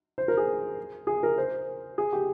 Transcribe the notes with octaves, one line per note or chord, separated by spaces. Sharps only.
C5
A#4
G#4
G#4
A#4
C5
G#4
G4